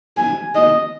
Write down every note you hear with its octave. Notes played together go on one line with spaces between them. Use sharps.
G#5
D#5